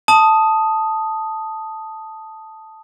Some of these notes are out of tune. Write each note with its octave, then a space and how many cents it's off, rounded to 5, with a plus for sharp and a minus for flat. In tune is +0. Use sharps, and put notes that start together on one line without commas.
A5 +0 D#6 +0